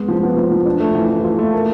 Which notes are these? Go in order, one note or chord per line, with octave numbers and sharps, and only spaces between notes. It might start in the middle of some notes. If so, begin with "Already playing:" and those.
Already playing: G#3 B3
F3
B3
F3
F3
D4
A3
E3
E3
F4
A3
A#3